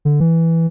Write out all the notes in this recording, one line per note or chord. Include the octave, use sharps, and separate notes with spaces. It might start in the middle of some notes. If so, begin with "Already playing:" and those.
D3
E3